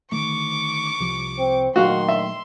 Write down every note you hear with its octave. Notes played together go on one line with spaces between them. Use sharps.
D3 D#3 A3 C#6 D6
C2 F3 G3
C4
A#2 D#3 F#3 A3 F#4 F5 C6
E5